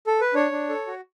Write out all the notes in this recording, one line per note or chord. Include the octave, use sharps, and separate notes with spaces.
A4
B4
D4 C#5
D4
A4
F#4